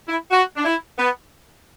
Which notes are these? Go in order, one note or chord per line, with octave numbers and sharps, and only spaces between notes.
E4
F#4
D4
E4
B3